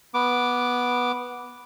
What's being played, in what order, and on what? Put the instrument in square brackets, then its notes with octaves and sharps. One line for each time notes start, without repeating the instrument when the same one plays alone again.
[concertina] B3 D6